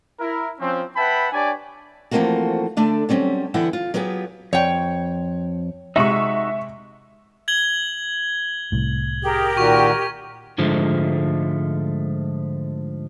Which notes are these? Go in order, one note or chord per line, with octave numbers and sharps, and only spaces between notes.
E4 A#4
F3 C4 C#4
B4 E5 F#5 G5 A5 B5
D4 G4 C#5 D5 G#5
E3 F3 A3 A#3 C4 F#4
D3 A3 D4 D5
F#3 G3 C4 C#4
D3 E3 B3 E4 F#5 G5
F4
F#3 B3 F4 G4 G#4
F2 C#5 G5
C3 G#3 D#4 F#4 E5 C#6
G#6 F#7 G7
C2 A2
G4 G#4 A#4
A#2 D#3 F#4 C#6
G#2 D3 F3 G#3 A3